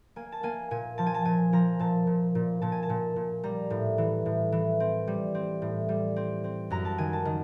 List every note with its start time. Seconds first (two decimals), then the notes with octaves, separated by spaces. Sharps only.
0.16 A#3 G#5
0.32 A5
0.43 A#3 G#5
0.71 A#2 G#5
0.98 F3 A5
1.06 G#5
1.14 A5
1.25 A#2 G#5
1.53 F3 A#5
1.79 A#2 A5
2.07 A#2
2.35 A#2
2.62 A#2 A5
2.72 G#5
2.83 A5
2.89 A#2
3.16 A#2
3.44 G3 A#5
3.70 A2
3.98 E3
4.26 A2
4.52 E3
4.80 C4
5.07 G3
5.35 C4
5.62 A2
5.89 G3
6.16 C4
6.44 C4
6.70 F#2 A#5
6.85 A5
6.98 D#3 G#5
7.13 A5
7.25 D#3